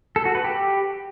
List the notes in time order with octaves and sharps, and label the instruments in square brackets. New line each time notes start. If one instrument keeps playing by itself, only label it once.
[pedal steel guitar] A4
F#4
B4
G4